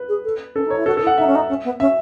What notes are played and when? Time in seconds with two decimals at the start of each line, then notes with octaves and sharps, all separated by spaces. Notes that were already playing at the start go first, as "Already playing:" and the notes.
Already playing: B4
0.09 G#4
0.24 A4
0.55 C#4 A4
0.65 D#4 C#5
0.76 E4
0.86 F#4 A4
0.97 E4 A4
1.07 F#5
1.18 D#4 E5
1.27 C#4
1.35 D#4
1.49 C#4
1.64 B3
1.80 C#4 E5